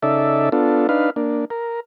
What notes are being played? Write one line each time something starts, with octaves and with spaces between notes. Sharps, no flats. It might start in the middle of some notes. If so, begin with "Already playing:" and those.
C#3 D#4 A4 D5 E5
B3 D4 F4 A4
D4 D#4 B4 F5
A#3 D4
A#4